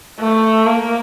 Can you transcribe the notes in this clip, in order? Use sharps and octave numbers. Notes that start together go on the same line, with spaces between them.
A3
A#3